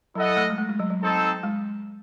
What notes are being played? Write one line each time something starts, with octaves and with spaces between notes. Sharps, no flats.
F#3 E4 A4 D#5 F#5
A3
G#3
A3
G#3
F#3
F#3
C4 D#4 A4
G#3